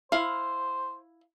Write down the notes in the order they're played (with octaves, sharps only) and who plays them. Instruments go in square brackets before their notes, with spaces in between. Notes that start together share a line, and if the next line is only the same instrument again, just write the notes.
[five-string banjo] E4 F5 [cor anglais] C5